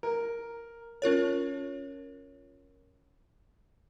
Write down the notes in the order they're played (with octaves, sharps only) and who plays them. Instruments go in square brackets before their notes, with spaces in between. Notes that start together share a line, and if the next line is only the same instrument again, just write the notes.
[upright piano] A#4
[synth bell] C#4 F4 A#4 C#5